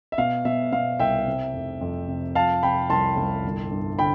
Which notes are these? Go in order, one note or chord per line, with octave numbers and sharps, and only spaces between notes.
E5
B2 F5
B2 E5
B2 F5
C2 E5 G5
C3
F1
F2
C3
F3 F5 A5
C3 G5 B5
C2 A5 C6
C2
G1
G2
D3 G5 B5